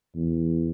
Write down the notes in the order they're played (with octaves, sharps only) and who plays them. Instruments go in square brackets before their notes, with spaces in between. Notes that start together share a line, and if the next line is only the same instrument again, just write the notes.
[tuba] E2